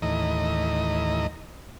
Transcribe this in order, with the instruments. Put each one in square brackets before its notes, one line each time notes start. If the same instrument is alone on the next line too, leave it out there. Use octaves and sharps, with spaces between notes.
[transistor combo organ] D#2 A2 E3 D#5 A#5